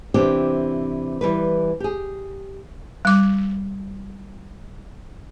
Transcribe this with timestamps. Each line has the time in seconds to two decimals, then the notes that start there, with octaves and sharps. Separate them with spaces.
0.14 C3 E3 C4 D4 G4
1.21 E3 G3 B4
1.80 G4 G#4
3.05 G3 D6